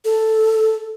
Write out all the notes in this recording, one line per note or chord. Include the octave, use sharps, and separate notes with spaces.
A4